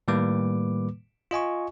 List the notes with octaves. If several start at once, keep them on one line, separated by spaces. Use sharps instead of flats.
A2 D#3 G3 A#3 B4 D6
F4 D#5 G#5 C#6